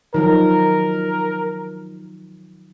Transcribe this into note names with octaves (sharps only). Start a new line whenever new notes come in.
D#3 F3 F#3 A#4